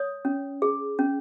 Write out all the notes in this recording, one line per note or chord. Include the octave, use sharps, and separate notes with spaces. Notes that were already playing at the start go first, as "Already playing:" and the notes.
Already playing: C#5 D#6
C#4
G#4
C#4